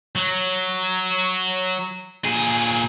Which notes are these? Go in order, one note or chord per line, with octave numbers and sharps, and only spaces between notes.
F#3
A#2 G#4